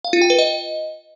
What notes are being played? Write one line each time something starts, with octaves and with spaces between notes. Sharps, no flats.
F5
F4
G5
B4
D#5